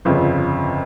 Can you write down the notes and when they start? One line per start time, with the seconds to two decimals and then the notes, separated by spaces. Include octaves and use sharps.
0.05 G1 F2 C#3